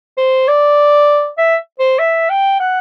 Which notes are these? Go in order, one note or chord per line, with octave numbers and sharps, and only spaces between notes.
C5
D5
E5
C5
E5
G5
F#5